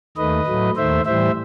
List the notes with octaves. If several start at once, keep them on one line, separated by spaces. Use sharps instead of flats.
D#2 D#3 A3 B4 D#5
A2 F#3 A3
D#2 D#3 A3 C5 E5
A2 E3 G3 C5 E5